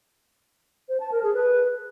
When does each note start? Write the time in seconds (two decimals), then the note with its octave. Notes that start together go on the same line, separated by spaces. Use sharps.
0.89 C5
1.00 A5
1.12 A#4
1.23 G#4
1.34 B4